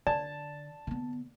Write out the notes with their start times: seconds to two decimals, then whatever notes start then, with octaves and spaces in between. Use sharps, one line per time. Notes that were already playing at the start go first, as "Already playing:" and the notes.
0.07 D3 D5 A5
0.87 D3 B3